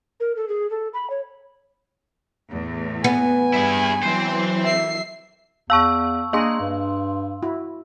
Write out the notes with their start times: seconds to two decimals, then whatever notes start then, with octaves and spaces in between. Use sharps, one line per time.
0.20 A#4
0.36 A4
0.48 G#4
0.70 A4
0.94 B5
1.10 C#5
2.49 E2 A2
3.04 B3 G#5
3.54 G2 E4 G#4
4.03 E3 F#3 C4 C5
4.64 E5 C7
5.70 E2 F5 A5 C#6 E6
6.33 A#3 D4 G#4 D#5 F5 C6
6.61 G2
7.43 E4 F#4